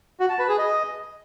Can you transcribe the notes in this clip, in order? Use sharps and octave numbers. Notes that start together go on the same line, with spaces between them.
F#4
A5
B4
G#4
D#5